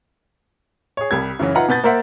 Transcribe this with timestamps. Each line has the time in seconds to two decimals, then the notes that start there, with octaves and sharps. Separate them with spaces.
0.97 G#4 C#5
1.11 C2 G3 G#6
1.39 F#2 C#3 E3 F#3
1.55 D#4 F4 B4 E5 F#5 A#5
1.69 B2 B3 G6 A6
1.84 A#3 A#4 C5 E5 F#5